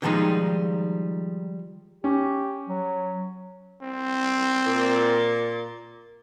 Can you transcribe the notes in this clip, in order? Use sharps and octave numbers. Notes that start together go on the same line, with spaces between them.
D3 D#3 F3 G3 G#3 D#4
C#4 G4
F#3
C4
A#2